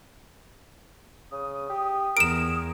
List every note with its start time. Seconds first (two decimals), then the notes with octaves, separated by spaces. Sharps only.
1.32 C#3 D#6
1.69 G4
2.17 E2 A#4 D7 E7